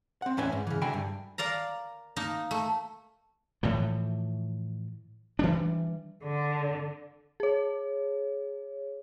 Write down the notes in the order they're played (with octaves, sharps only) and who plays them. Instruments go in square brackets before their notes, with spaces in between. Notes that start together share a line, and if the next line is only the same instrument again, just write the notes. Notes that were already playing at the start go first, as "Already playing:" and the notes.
[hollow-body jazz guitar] C4 F#5
E2 A2 C#4 B4 E5 G#5
G#2
C#3 E3
D3 F#4 E5 G5 G#5 B5
G2
[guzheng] A#4 D5 F5 A#5
A#3 D#4
A3
[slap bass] A2 E3 F3
E3 G3 D4
[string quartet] D3
[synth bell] G#4 C#5